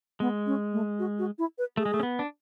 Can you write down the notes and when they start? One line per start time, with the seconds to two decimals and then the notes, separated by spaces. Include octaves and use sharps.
0.20 G#3 B3
0.46 C#4
0.73 A3
0.99 F#4
1.19 F#4
1.38 E4
1.58 B4
1.77 A3 G#4
1.86 G#3
1.94 A3
2.00 C#4
2.03 B3
2.19 D4